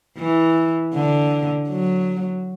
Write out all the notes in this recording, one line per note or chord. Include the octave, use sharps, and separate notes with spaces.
E3
D3
F#3